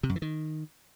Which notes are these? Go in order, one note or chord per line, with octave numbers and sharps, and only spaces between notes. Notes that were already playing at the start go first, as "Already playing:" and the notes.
C3
F#2
E3
D#3